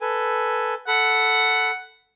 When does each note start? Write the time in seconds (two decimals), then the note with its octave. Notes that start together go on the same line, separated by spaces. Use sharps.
0.01 A4 B4 G#5
0.87 A4 F#5 B5